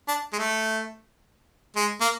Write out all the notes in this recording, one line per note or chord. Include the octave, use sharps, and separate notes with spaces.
D4
G#3
A3
G#3
A#3